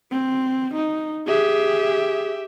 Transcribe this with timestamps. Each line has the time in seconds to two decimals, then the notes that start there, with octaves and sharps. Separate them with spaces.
0.11 C4
0.75 D#4
1.27 G4 G#4 E5